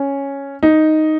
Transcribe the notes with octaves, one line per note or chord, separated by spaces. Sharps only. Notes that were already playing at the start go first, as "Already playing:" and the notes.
Already playing: C#4
D#4